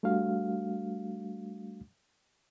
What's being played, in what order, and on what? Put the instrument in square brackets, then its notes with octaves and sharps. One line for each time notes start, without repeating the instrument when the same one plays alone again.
[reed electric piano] G3 A3 D4 F#4 F5